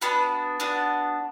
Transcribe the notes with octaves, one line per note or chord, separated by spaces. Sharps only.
B3 D4 F#4 B5
B3 D4 F#4